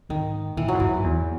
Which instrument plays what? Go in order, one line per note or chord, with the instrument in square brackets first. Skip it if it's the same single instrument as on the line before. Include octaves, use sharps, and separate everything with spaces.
[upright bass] G#2 [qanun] D#3
[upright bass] A#2 [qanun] E3
[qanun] F#3
[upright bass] G#2
[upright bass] F#2 [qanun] E3
[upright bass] E2